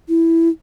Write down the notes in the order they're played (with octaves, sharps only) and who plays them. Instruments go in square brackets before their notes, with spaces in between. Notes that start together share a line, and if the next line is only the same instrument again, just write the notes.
[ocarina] E4